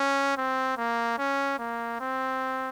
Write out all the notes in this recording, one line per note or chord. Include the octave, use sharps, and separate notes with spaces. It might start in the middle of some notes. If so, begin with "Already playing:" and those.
Already playing: C#4
C4
A#3
C#4
A#3
C4